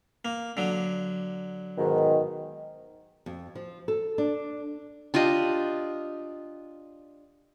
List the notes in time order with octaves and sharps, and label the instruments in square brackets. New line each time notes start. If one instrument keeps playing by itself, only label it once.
[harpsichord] A#3
D3 F#3
[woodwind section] G#2 B2 D#3
[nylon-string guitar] F2
F3
A4
D4
[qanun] D4 F4 G4 D#5